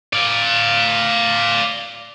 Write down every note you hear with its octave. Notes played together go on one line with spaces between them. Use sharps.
D5 F5